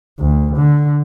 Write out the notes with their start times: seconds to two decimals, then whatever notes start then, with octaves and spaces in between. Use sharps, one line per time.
0.19 D2
0.56 D3